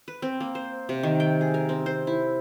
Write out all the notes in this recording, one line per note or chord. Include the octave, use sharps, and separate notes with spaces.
B4
C4
A#3
C5
C3
D#3
G5
G#4
A#4
C4
C5
E4